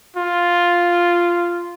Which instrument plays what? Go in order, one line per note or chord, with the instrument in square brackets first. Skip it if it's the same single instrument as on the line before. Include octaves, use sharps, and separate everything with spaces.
[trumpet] F4